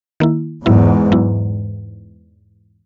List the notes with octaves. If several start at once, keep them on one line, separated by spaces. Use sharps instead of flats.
D#3 A#3 E4
E2 G#2 F#3 B3 E4
F#3 B3 E4